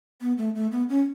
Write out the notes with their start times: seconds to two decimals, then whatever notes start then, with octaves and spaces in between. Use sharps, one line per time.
0.21 B3
0.38 A3
0.55 A3
0.72 B3
0.89 C#4